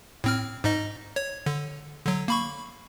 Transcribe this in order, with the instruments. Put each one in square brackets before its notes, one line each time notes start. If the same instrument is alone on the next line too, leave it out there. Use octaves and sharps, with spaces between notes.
[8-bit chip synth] A2 C4 F6
G#2 D#4 D#5
C#5
D3
D3 F#3
A#3 B5 C#6